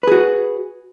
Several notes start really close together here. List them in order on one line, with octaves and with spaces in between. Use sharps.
B4 G#4 F#4